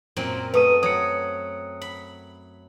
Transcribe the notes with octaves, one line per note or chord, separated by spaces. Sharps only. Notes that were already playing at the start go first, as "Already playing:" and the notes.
F#2 A#2 C4
A3 B4 D#6 D#7
F#3 D#6 C#7
B5